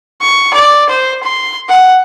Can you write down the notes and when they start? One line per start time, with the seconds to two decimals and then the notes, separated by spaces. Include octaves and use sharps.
0.21 C#6
0.54 D5
0.89 C5
1.23 C6
1.69 F#5